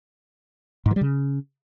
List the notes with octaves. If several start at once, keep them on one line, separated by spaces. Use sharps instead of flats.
G#2
E3
G3
C#3